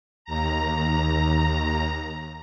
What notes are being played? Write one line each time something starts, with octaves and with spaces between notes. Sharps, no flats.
D#2 A#5